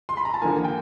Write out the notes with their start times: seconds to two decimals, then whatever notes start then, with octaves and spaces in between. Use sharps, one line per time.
0.09 C6
0.17 B5
0.25 A#5
0.34 A5
0.42 D#2 D3 F3 A#3 G#5
0.64 G5